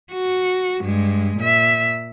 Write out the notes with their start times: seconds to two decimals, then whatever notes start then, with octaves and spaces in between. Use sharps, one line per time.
0.12 F#4
0.81 G2 G#3
1.37 A#2 E5